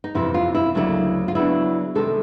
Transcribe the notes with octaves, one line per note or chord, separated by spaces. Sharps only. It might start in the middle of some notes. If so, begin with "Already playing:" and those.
D#4
F2 C3 E3 E4
F4
E4
D2 C#3 F#3 A#3 D4 E4
F4
C#3 F#3 B3 D4 E4
C3 D#3 G#3 A4